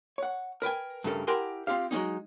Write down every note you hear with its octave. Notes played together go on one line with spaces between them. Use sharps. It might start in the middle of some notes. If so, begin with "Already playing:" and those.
C#5 F#5
A#4 B4 G5 G#5
G2 C#3 A3 A4 A#4
E4 G4 A#4 F#5 G#5 C6
C4 F4 G4 F5
F#3 G#3 A#3 C#4 D#4